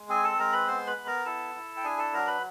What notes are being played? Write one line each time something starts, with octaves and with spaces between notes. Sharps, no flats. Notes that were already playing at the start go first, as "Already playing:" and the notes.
Already playing: G#3
C4 G#4 G#5
A4 A5
G#3 A#4 A#5
B4 B5
B3 C5 C6
B4 B5
B3
A#4 A#5
E4 A4 A5
E4
G5
D4 G#4 G#5
A4 A5
F#3 A#4 A#5
B4 B5